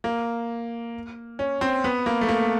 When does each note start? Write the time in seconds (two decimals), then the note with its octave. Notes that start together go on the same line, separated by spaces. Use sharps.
0.04 A#3
1.39 C#4
1.61 C4
1.84 B3
2.06 A#3
2.21 A3
2.29 A#3